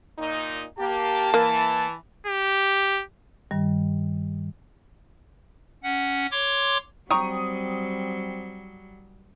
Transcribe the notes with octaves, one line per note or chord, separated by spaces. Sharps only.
A#2 D#4
A#3 G4 A5
E3 A#3
G4
G2 D#3 G3
C#4 F#5
C#5 C6 D6
F#3 G3 C4 G5 A#5 C#6 D#6